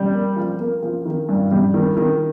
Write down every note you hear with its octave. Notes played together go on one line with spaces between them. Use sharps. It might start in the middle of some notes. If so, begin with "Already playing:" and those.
Already playing: G3
A#3
F3
A#3
F3
D#3
G2
G3
D#3
D#3